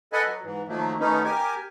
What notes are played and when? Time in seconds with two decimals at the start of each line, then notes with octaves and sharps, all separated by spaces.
0.13 A4 B4 D#5 F#5 G#5
0.26 F#3
0.44 G#2 E3
0.68 D#3 F3 F#3 A3 A#3
1.00 D#3 A3 B3 C#4 D#4
1.24 G4 A#4 G#5